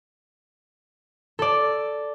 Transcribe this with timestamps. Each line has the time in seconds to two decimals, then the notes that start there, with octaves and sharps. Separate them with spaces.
1.39 A4 D5